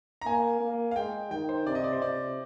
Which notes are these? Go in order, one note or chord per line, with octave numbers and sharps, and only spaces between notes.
A#5
A#3 G#5
A#3
F5
G#3 G5
D#3 G5
C5
C3 D5
D#5
D5
C5
C3 D5